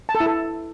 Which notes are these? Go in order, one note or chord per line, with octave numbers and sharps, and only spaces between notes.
A5
A4
E4
A4